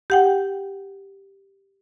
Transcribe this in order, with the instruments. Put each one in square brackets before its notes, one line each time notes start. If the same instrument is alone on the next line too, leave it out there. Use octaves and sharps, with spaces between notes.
[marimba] G4 F#5 G5